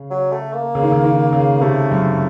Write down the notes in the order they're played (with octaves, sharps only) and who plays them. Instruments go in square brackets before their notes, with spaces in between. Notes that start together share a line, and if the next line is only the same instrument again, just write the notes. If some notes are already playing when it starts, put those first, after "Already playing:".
Already playing: [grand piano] C#3
[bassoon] F#3
A3
A#3
[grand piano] C#3
D#3
C#3
D#3
C#3
[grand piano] C3 [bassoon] A3
[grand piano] F#2